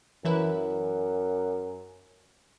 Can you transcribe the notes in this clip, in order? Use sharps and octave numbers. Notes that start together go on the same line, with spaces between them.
F#2 E3 E4 B4